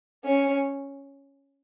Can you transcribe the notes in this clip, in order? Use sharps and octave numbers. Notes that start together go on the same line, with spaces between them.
C#4